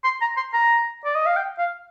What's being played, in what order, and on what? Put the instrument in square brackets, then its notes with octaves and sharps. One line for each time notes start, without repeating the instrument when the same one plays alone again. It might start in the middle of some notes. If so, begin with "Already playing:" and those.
[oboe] C6
A#5
C6
A#5
D5
D#5
F5
G5
F5